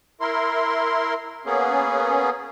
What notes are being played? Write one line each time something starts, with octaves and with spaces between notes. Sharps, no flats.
E4 A#4 C6
A#3 B3 C#4 G#4